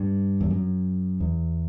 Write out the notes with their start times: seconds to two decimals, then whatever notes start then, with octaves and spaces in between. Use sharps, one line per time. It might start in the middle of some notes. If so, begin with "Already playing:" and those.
Already playing: G2
0.41 E2
0.51 F#2
1.20 E2